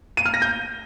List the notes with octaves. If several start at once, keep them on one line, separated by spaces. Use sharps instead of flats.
D#7
F6
A#6
G6